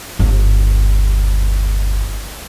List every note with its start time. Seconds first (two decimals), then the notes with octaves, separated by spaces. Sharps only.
0.19 G1 D#2